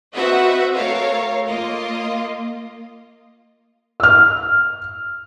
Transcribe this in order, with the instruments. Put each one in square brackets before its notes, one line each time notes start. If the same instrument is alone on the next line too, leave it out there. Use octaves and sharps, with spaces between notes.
[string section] C4 F#4 B4 D#5 E5 F#5
A3 A4 A#4 C#5 F5
A#3 F4 D#5
[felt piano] E6 F6